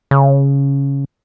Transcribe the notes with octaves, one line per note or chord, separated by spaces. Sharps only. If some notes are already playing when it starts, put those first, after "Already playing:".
C#3